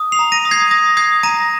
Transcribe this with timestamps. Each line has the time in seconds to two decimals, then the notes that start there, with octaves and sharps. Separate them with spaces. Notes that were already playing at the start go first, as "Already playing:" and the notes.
Already playing: D#6
0.12 C7 F7
0.19 A#5
0.32 A#6 D#7
0.45 D#6
0.51 G#6 C7
0.71 D#6 A#6
0.97 D#6 G#6 C7
1.23 A#5 A#6 D#7